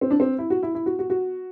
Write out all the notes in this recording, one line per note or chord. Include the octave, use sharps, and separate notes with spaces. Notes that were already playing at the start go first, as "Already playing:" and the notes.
C4
D4
C4
E4
F#4
E4
E4
F#4
F#4
F#4